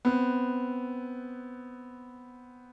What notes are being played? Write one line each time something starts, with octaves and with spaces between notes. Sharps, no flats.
B3 C4